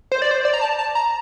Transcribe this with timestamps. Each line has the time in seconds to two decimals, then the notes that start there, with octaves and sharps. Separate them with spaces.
0.12 C5
0.22 D5
0.31 C5
0.45 D5
0.54 A#5
0.61 A5
0.79 A5
0.95 A#5